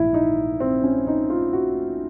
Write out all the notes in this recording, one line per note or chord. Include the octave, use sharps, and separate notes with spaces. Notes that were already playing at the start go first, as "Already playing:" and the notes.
Already playing: A#1 G#2 E3 E4
D#4
C4
C#4
D#4
F4
F#4